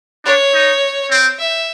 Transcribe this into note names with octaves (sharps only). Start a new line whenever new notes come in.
D4 C#5
D#4
C4
E5